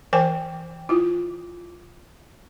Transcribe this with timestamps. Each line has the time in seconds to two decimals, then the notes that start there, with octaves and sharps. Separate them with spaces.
0.13 E3 A#4 C5 G5 G#5
0.89 E4 F4